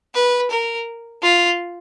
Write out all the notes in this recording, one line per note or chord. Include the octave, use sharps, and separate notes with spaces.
B4
A#4
F4